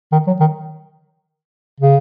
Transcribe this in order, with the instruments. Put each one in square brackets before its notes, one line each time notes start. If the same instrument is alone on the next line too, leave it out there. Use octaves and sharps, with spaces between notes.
[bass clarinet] D#3
F#3
D#3
C#3